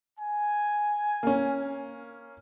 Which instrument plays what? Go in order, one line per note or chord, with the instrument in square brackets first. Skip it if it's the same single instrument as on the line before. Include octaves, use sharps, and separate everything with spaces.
[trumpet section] G#5
[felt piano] A#3 C#4